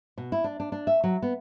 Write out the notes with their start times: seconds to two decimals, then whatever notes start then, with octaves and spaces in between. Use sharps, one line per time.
0.18 B2
0.32 E4
0.44 D4
0.60 D4
0.72 D4
0.87 E5
1.04 F#3
1.22 B3